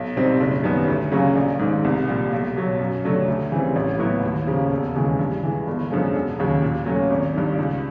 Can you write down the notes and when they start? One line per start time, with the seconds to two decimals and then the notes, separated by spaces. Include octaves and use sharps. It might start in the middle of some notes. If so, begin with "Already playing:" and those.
Already playing: B1
0.16 B2 G3 C4 D#4
0.40 F#1
0.64 F#2 D#3 G3 B3
0.88 D2
1.11 C#3 F#3 A#3 C#4
1.36 A#1
1.59 G#2 D#3
1.84 C2
2.08 A#2 G3
2.32 B1
2.56 B2 F#3
2.79 F#2
3.04 D3 F#3 A3 D4
3.28 D2
3.52 C#3 E3 G3 C4
3.76 A1
3.99 A2 F#3 B3 E4
4.23 D#2
4.47 C#3 F3 A#3
4.72 E1
4.95 D#2 C#3 E3 G#3
5.19 G2
5.43 E3 G#3
5.67 G1
5.90 F#2 D3 F3 G#3
6.14 E1
6.39 D#2 C#3 F#3
6.62 A#2
6.86 F#3 A3 C#4
7.10 G#1
7.34 G2 D#3
7.58 C#2